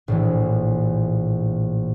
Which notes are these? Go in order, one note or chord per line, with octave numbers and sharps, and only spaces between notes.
A#1 A2 E3